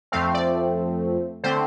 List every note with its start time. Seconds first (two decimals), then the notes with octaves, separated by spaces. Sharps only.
0.12 F2 F3 A3 C4 F5
0.34 D5
1.44 D3 A3 C4 C5